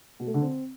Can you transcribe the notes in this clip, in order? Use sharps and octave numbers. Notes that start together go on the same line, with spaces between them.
B2
A3
D3
C4